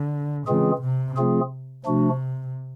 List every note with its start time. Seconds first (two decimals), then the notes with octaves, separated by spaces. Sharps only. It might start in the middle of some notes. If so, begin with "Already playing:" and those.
Already playing: D3
0.47 C#3 E3 G#3 C4 F4 G#4
0.81 C3
1.17 F3 A3 C4 F4 G#4
1.85 C3 F3 A3 D4 F#4